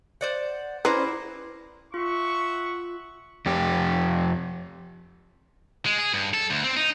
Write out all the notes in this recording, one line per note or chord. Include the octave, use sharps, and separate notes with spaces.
C5 D5 F#5
C#4 E4 B4 C5 D5 A#5
F4 E5 F#5 C#6
F2 G4
G#3
G#4
G2
A4
D2
C4
D#4